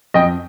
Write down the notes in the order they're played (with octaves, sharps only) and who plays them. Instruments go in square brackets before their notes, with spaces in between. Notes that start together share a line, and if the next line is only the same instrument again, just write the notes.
[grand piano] F2 D#5 G5